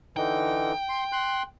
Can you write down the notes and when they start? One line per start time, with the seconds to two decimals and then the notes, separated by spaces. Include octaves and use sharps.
0.17 D3 E3 D#4 G5
0.89 C6
1.12 C6 F#6